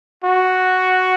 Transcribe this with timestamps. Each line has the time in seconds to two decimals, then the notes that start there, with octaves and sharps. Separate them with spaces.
0.24 F#4